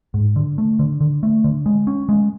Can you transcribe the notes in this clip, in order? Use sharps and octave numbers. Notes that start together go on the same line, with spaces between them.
G#2
D3
A3
D3
D3
A3
D3
G#3
C#4
G#3